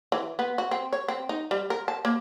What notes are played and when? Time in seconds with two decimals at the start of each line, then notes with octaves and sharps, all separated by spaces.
0.12 E3
0.39 B3
0.58 F#4
0.71 C4
0.93 C#5
1.08 C4
1.29 D#4
1.51 G3
1.70 A#4
1.88 A5
2.05 A#3